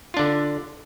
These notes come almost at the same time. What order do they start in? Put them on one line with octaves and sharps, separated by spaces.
F4 D4 D3